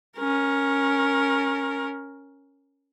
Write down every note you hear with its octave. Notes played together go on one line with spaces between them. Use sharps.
C#4 A#4